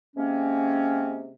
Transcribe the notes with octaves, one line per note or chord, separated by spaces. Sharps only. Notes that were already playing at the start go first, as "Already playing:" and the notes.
C3 G#3 A#3 C4 C#4